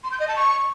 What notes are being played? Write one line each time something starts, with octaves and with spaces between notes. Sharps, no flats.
C6
G6
D#5
A5
C#6